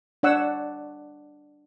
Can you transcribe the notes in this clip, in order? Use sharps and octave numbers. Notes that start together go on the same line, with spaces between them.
D4 C#5 F#5 E6